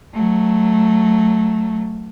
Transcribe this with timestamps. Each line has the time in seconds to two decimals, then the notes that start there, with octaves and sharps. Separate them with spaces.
0.14 F#3 A3